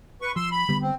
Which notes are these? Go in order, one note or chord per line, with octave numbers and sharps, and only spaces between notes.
B4 C#6
F3 C6 E6
B5
D3 G3 B3
C4